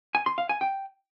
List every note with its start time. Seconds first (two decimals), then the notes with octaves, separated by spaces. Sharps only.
0.15 G#5
0.26 C6
0.38 F5
0.49 G#5
0.61 G5